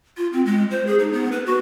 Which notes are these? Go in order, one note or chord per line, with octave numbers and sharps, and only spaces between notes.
F4
C4
G#3
C5
G#4
D#4
B3
B4
F#4